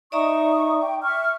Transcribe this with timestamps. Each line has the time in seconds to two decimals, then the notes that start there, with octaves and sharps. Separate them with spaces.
0.12 D#4 D5 E5 A#5 C#6 D#6
0.82 G5 D6
1.02 E5 C#6 F6